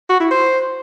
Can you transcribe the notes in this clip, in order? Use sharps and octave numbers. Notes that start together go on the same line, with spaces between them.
F#4
E4
C5